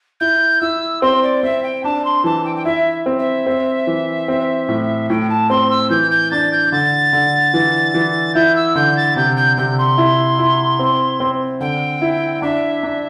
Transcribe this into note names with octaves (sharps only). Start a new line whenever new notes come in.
E4 G6
E4 E6
C4 C6
D5
C4 E5
G5
D4 A5
C6
E3 A5
G5
G5
E4 E5
C4
E5
C4
E3
C4
A2
A2 G5
A5
C4 C6
E6
E3 G6
G6
D4 A6
G6
D3 A6
D3
E3
E3
E4 G6
E6
D3 G6
A6
C3 G6
G6
C3 G6
C6
E4
E4
C4
C4
D3 G5
E4
D4 E5
D4